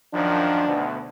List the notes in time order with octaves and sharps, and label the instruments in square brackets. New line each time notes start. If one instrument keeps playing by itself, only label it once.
[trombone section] F#2 D#3 F3 [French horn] D4
[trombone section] D2 B2